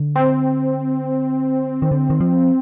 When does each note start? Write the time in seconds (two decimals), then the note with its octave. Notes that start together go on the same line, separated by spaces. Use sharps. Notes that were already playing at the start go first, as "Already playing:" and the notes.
Already playing: D3
0.16 C4
1.82 D#3
1.91 D3
2.10 D#3
2.21 F3